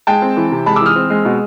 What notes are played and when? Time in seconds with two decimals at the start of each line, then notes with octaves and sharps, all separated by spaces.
0.07 G#3 G5 A5
0.22 C4
0.37 E3
0.52 C3
0.66 G#3 A5 B5
0.76 E3 D6 E6
0.86 D#6 F6
0.96 C4
1.10 G#3
1.25 B2